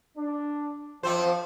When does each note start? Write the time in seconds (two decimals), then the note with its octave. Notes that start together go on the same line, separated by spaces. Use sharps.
0.17 D4
1.03 F2 F3 C4 C5